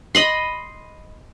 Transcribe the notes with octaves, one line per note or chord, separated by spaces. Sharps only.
D#5 B5 C6